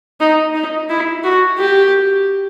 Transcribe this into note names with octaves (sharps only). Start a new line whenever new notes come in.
D#4
D#4
E4
F#4
G4